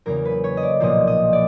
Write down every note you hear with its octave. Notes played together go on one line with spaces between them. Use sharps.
E2 C#3 F#3 A#3 A#4
B4
C#5
D#5
D5
B1 A#2 F3 A#3 D#5
D#5
D5